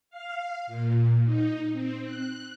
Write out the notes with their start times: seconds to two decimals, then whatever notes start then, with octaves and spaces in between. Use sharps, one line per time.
0.10 F5
0.67 A#2
1.25 D#4
1.73 C4
2.05 F#6